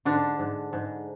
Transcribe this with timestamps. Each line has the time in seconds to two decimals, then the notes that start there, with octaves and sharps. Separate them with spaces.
0.05 G#2 D3 D4
0.39 G#2
0.73 G#2